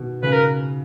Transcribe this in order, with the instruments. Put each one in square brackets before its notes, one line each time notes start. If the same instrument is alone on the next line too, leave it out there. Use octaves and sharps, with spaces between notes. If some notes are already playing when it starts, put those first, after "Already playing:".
Already playing: [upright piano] B2 D#3
[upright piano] C#3 [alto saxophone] B4
[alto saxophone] A#4